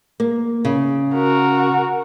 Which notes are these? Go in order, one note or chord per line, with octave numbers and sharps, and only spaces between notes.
A#3
C#3
F#4 A#4